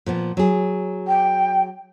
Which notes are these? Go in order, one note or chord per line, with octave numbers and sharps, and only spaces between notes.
A#2 F3 B3
F#3 G#4
G5